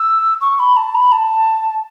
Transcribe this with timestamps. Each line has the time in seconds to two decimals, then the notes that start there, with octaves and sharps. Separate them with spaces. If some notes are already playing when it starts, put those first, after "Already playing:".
Already playing: E6
0.41 C#6
0.59 B5
0.76 A5
0.95 B5
1.12 A5